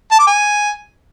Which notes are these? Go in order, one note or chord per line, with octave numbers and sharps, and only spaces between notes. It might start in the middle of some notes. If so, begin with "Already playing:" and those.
A5
D6
G#5